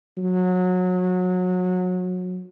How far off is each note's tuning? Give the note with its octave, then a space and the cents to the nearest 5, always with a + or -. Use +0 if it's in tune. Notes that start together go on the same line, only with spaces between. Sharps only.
F#3 -25